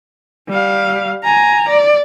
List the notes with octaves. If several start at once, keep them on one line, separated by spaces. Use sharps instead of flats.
G3 F5
G#5 A#5
D5